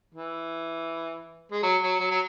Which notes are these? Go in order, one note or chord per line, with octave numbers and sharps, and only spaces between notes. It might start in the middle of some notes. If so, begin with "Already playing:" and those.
E3
G#3
F#3
F#3
F#3
F#3